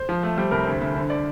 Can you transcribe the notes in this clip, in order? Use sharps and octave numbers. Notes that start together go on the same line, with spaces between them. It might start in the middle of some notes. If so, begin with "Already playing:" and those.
Already playing: C5
F3
A3
G3 C5
C2 A#4
D2 C5
D2
D3 C5
D3 D5